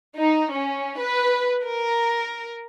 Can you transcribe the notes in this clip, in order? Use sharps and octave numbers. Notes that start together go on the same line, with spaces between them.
D#4
C#4
B4
A#4